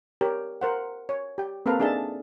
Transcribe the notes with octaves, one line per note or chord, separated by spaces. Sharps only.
G4 A#4 C#5
A#4 C5 F#5
C#5
G4 G5
A#3 C4 A4 B4 F5 A#5
D4 D#4 G#4 A4 E5 A5